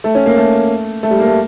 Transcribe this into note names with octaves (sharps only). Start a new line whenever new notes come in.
A3
C#4
A#3
A3
A3
G3
A#3
A3